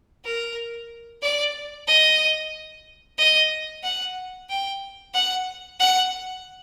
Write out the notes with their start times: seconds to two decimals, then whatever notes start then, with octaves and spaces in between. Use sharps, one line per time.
0.24 A#4
1.22 D5
1.88 D#5
3.18 D#5
3.83 F#5
4.49 G5
5.14 F#5
5.80 F#5